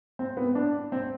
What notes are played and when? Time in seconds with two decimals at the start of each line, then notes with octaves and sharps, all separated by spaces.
0.19 C4
0.37 B3
0.55 D4
0.92 C4